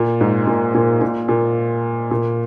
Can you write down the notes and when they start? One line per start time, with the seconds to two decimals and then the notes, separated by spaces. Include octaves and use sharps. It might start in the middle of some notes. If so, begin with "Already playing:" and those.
Already playing: A#2
0.21 G#2
0.47 A#2
0.74 A#2
1.01 A#2
1.28 A#2
2.11 A#2